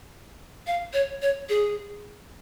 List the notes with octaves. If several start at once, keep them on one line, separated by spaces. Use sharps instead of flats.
F5
C#5
C#5
G#4